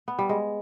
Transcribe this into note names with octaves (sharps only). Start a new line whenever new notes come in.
B3
G3
G#3